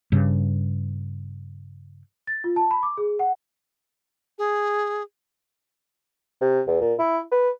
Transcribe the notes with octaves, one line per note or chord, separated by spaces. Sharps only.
G2 C#3
A6
F4
A5
B5
D6
G#4
F#5
G#4
C3
E2
A#2
E4
B4